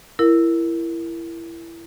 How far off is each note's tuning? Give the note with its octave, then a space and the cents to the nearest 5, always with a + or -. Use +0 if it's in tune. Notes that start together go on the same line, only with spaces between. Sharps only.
E4 +20 A#4 +0